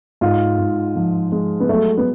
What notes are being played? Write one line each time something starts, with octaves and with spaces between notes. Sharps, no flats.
G#2 F4
G#2
F3
G#3
B3
F#3 A3
B3